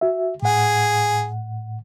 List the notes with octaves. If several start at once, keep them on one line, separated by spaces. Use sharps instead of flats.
F#4 E5
A2 G#4 F#5